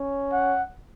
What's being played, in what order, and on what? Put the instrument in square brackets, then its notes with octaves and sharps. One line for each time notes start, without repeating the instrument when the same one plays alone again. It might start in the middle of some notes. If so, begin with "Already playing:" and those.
Already playing: [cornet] C#4
[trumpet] F#5